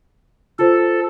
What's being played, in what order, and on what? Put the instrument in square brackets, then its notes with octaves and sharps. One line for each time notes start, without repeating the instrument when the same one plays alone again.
[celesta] F4 C5 [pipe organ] A4